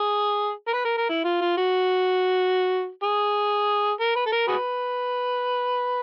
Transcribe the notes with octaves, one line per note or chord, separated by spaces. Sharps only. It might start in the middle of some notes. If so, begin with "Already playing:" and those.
Already playing: G#4
A#4
B4
A#4
A#4
E4
F4
F4
F#4
G#4
A#4
B4
A4
A#4
F#4 G#4 B4